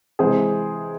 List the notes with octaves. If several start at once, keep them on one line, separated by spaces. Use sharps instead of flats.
C3 E3 G#3 G#4 C5